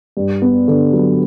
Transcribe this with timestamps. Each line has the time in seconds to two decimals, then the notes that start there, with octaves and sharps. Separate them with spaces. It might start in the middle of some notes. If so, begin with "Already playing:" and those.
0.17 G2
0.42 B3
0.68 D3
0.93 F#3